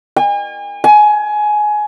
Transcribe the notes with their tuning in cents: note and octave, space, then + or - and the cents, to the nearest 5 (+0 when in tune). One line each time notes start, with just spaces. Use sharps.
G#5 -40
G#5 +20